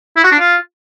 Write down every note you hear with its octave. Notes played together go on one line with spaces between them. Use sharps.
E4
F#4
D4
F4